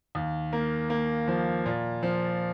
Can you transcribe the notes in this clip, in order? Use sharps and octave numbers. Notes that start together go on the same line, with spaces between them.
D#2
A#3
A#3
F3
A#2
F3